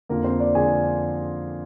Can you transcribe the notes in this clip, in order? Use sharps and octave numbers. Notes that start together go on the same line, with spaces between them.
F2 D3 F3 A#3 A#4
C4 C5
D4 D5
F2 D3 F3 G#4 G#5